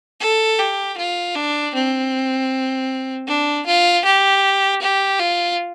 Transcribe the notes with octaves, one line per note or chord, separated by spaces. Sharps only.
A4
G4
F4
D4
C4
D4
F4
G4
G4
F4